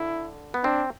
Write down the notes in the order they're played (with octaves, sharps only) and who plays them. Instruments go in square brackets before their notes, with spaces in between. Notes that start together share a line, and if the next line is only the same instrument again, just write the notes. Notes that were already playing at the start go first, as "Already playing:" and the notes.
Already playing: [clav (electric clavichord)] D3 [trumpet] E4
[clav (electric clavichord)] B3
[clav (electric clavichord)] C4 [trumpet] D4